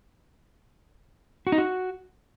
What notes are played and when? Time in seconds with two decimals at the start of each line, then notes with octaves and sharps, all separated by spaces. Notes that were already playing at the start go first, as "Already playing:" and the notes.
1.47 F#4
1.52 D#4
1.58 F#4